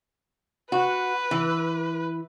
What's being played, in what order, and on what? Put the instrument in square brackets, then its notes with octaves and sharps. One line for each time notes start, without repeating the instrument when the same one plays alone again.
[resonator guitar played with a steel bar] F#4 [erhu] B4
[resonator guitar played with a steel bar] E3